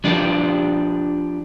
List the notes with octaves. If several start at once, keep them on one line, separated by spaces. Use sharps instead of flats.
F3 D4 G4